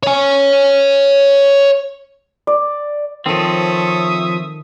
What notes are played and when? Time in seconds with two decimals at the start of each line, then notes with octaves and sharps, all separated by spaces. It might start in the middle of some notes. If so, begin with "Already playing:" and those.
0.03 C#5 G#5
2.47 D5
3.26 D#3 F3 C4 A4 C#5 E5 D#6